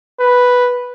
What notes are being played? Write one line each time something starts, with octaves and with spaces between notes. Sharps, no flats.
B4